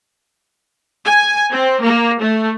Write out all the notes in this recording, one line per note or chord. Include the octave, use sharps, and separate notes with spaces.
G#5
C4
A#3
A3